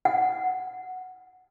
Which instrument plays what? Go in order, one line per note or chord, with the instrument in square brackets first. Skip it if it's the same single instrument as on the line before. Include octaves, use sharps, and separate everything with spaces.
[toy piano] F#5